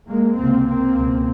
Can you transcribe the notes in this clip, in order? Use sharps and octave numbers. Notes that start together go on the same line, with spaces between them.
G#3 A#3
C#2 C3 A#3 C4
A#3 C4
C#2 B2